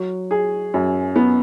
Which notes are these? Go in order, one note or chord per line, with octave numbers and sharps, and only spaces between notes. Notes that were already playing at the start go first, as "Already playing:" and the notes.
Already playing: F#3
G#4
F#2
B3